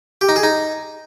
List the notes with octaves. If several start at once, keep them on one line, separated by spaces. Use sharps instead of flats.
G4
D#4
G#4
D#4